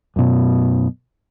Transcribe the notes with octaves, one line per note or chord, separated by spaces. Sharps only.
F#2 B2